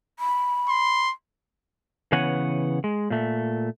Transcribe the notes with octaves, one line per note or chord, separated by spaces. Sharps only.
B5
C6
C#3 E3 B3 C#5 F#5 G#5
G#3
A#2 A3